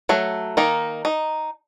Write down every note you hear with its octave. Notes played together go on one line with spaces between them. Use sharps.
F#3 A3
D#3 A#3 D#4
D#4